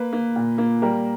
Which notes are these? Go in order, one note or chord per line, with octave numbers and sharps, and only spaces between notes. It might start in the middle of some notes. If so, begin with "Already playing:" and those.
Already playing: A#3 B4
A#3
A#2
A#3
G3 A#4